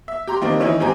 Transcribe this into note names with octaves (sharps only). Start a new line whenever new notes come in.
E5
G4 A#5 C6
D#3 G3 A#3 C4 D4 D#4
D#3 E3 C#4 D#4 E4
G#2 C4 G4 G#4 G#5 A#5